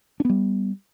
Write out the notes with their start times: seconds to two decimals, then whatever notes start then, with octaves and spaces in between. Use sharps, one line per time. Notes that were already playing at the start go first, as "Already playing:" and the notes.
0.20 D4
0.25 B3
0.29 G3